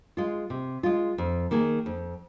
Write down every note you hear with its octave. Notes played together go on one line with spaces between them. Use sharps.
G#3 F4
C3
G#3 F4
F2
D#3 A#3 G#4
F2